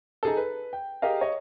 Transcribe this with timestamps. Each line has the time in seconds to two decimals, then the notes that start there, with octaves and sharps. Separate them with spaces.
0.23 D#4 G#4 A4
0.37 B4
0.73 G5
1.02 G4 G#4 A#4 D#5 F5
1.21 C#5 D#5